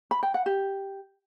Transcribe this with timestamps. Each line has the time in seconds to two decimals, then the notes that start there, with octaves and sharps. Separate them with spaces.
0.11 B5
0.23 G5
0.34 F#5
0.46 G4